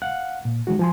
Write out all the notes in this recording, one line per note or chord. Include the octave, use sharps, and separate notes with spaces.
F5 F#5 F#6
A#2
D#3 E3 G#3 F#4
F3 G#5 C6